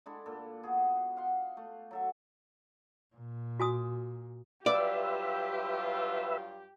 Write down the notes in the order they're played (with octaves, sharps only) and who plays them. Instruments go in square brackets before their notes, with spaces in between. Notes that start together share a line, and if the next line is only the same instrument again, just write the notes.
[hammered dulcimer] G#3 D4 E4 A4
A#2 A4
B2 F#4 G#4
F5 F#5 C6
A3
F#3 A4 E5
[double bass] A#2
[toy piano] F#4 G#5 D#6
[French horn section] G2 F#3 F4 [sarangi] G4 [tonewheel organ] B4 E5 [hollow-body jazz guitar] D5